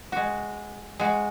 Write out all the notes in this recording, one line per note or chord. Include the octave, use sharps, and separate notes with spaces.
G#3 F#4
G#3 F#4